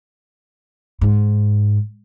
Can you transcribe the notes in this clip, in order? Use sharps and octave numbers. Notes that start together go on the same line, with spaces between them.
G#2